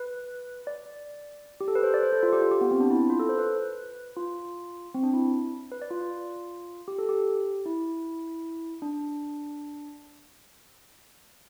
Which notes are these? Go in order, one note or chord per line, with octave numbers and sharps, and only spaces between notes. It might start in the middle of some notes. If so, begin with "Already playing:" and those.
Already playing: B4
D5
G4
A4
B4
C5
D5
C5
A4
F4
G4
F4
G4
B3
C4
D4
E4
F4
A4
C5
B4
F4
C4
D4
E4
B4
D5
F4
F4
G4
A4
G4
E4
D4